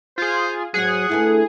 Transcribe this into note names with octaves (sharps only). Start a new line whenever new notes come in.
F4 G#4 C5
G#2 F#3 F#4 G#4 F#5
D2 A3 E4 B4